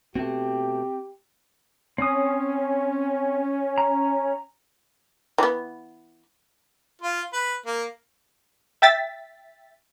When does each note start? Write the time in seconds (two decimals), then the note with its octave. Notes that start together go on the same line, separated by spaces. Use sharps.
0.15 B2 A3 C4 G4
1.98 C4 C#4 D#6
3.78 A#5
5.38 E3 B3
7.02 F4
7.33 B4
7.66 A#3
8.82 E5 G5 A6 B6